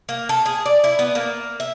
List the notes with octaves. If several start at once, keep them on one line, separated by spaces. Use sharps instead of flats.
A#3
A4
G#4
D5
E4
B3
A#3
E5